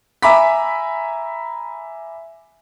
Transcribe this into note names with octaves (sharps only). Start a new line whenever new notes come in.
E5 G#5 A#5 B5 D6 B6